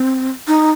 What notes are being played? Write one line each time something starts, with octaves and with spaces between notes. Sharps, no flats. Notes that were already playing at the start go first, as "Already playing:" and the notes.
Already playing: C4
D#4